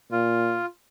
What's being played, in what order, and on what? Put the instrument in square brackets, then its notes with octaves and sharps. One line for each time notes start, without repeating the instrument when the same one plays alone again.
[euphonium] A#2 [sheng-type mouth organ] F4